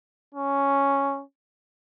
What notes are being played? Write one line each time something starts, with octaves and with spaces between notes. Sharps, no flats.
C#4